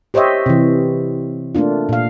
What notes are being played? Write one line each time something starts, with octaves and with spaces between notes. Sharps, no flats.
G4 C5 C#5 D#5 E5
C3 E3
A3 A#3 D4 F4
A#2 F5